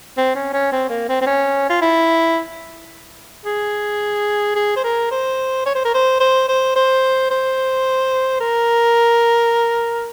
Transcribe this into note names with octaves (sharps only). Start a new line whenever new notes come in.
C4
C#4
C#4
C4
A#3
C4
C4
C#4
F4
E4
G#4
G#4
C5
A#4
C5
C#5
C5
A#4
C5
C5
C5
C5
C5
A#4